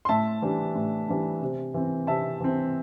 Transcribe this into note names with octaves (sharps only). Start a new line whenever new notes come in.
C6
A2 E5 A5
E3 G3 D4
A2
E3 G3 D4
C3
E3 C4
C3 E5 A5
E3 C4